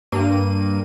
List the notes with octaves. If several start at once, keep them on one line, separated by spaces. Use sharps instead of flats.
G2 A#3 D#7